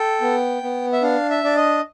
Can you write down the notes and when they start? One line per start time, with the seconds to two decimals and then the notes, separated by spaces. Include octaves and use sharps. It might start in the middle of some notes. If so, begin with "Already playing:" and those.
Already playing: A4 G5
0.21 B3
0.62 B3
0.92 E5
1.02 D4 F5
1.30 E5
1.44 D4 D5
1.57 D#5